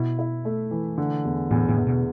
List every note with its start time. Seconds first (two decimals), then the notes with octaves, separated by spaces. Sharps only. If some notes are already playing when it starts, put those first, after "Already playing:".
Already playing: B2 E4
0.19 E4
0.45 A3
0.71 E3
0.98 D3
1.25 E2
1.51 E2 A2
1.69 A2
1.77 E2
1.87 B2